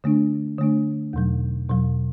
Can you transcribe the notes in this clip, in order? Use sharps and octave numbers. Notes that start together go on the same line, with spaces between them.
D3 A3 D4
D3 A3 D4
E2 B2 F#3
E2 B2 F#3